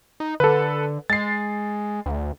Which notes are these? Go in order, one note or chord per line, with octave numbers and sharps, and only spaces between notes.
D#4
D3 A4 B4
G#3 A6 C7
D2